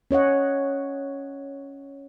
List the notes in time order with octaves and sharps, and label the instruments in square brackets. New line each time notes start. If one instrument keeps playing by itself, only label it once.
[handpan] C#4 C#5 D#5 F#5